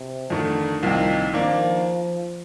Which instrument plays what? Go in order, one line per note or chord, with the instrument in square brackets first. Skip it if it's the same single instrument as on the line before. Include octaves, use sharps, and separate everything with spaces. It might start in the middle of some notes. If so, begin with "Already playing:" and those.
Already playing: [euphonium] C3
[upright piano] F2 D#3 A3 [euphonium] D3
[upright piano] C2 A#2 F3 C4 [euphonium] D#3
[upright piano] D#3 A#3 D4 [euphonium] F3